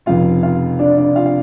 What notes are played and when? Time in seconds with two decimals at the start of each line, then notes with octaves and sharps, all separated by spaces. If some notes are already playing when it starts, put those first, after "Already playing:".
0.06 F1 F2 C#3 F4 F5
0.43 F4 F5
0.79 D4 D5
0.98 D4 D5
1.16 F4 F5
1.26 F5